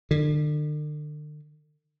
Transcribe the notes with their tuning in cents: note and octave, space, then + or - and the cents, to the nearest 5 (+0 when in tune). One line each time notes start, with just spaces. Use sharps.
D3 +40